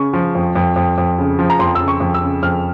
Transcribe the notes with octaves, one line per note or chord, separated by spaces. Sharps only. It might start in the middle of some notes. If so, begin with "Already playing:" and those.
Already playing: C#3 C#6
F3
F2
F2
F2
F2
C#3
F3
A#5
F2 C6
C#3 E6
C#6
F2
E6
C#3
F2 F6